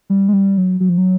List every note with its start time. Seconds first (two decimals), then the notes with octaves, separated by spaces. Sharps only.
0.10 G3
0.29 G#3
0.33 G3
0.58 F#3
0.80 F#3
0.89 F3
0.98 F#3